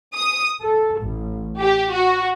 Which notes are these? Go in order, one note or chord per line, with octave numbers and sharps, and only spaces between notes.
D#6
A4
A1
G4
F#4